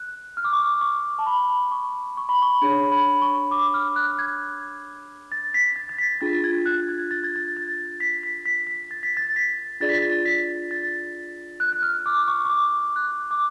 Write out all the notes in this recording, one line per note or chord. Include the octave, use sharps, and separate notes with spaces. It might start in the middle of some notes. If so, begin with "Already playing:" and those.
Already playing: F#6
F6
D6
C#6
D6
C#6
A5
B5
C#6
C#6
B5
C#6
D4 G#4 C#5 B5
B5
C#6
D6
F6
F#6
G#6
A6
B6
A6
A6
B6
D4 F4 G#4 A6
G#6
G#6
F#6
G#6
A6
G#6
A6
A6
B6
B6
B6
B6
A6
B6
A6
B6
D4 F4 G#4 D5 A6
B6
A6
B6
A6
F#6
F#6
F6
D6
C#6
C#6
D6
F#6
D6